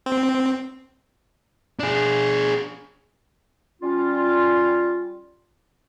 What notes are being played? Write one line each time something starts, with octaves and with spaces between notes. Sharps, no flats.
C4
D4 G#4
G3 C#4 F4